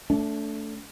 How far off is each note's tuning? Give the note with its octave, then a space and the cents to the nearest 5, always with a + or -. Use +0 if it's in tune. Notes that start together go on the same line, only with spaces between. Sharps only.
A3 +0 D4 -35